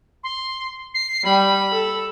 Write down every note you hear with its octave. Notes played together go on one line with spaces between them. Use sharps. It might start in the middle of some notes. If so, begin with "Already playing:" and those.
C6
C7
G3 B5
A4